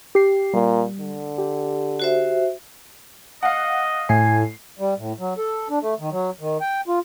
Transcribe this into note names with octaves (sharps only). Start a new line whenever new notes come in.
G4 C7
A#2 G3
D3
G4
F#4 C5 E5
D#5 F5 F#5
A2 G#5 C7
G3
A2
F#3
A4
D4
A3
D#3
F#3
D#3
G5
F4